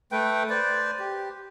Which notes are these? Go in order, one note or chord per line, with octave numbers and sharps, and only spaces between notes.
A3 B4 G5
B4 C5 D5
G4